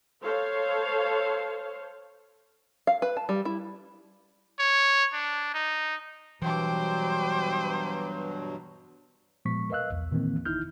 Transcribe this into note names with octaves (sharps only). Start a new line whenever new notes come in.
A4 C5 C#5 F5
F5
B4
A5
G3
E4
C#5
D4
D#4
G2 B2 E3 F#3 C5 G5 D6
A#2 F3 G#3 B3 C#6 B6
A#4 B4 D#5 F5 E6 F#6
B1 E2
A#2 D#3 E3 A#3 C4
G1 D#4 E4 F6 G6